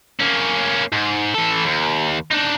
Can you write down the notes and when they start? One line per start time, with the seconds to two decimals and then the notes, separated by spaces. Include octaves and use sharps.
0.20 A#3 C#4
0.93 G#2
1.34 E3 A4
1.65 D#2
2.31 D4 D#4